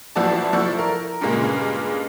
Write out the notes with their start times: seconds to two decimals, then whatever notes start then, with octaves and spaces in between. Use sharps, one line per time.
0.16 A1 F3 E4 F#4 D5 A5
0.53 F3 E4 A4 D5 C#6
0.79 A#4
1.21 G2 A#2 C#3 G#3 A#3